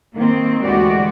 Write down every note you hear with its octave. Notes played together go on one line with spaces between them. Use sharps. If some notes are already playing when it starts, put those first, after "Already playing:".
D#3 A#3 C4
D2 E3 G#3 F#4 G4 D5